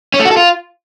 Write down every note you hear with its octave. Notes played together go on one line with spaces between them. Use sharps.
C#4
A3
F#4
A4
F4